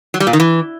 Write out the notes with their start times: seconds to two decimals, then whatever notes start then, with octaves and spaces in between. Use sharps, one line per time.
0.14 F#3
0.20 G3
0.27 A#2
0.33 D#3
0.40 E3